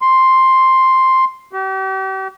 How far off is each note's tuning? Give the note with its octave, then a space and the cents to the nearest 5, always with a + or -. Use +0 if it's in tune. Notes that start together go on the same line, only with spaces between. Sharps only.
C6 +5
G4 -40